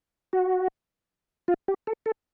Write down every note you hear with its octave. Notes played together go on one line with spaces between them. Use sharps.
F#4
F4
G4
A4
A4